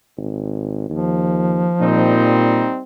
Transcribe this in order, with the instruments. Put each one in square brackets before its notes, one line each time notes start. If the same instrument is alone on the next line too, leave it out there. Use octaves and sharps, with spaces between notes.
[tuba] G#1
[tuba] D#2 [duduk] F3
[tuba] A#2 [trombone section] G3 C4 D#4